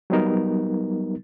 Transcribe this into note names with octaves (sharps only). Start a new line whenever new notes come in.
F#3 G3 B3 D#4 A#4